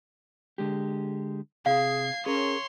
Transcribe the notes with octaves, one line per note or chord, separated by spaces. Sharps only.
D3 G#3 G4
C3 G#4 F5 G#6 C7
C#4 G#4 A#4 C#5 C6